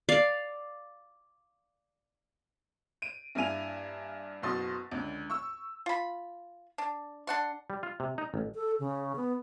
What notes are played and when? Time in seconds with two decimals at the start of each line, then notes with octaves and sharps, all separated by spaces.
0.09 D5 F5
3.02 D7 D#7
3.35 G2 A#3 E4 G#5 D#7 F7
4.42 F#1 B2 C6 D#6 A6
4.91 C#2 D3
5.30 C#6 E6
5.86 F4 B5
6.78 D4
7.27 D4 F#5 C6
7.70 G3
7.83 F4
8.00 C3
8.18 D#4
8.34 A1
8.54 A4
8.79 C#3
9.16 B3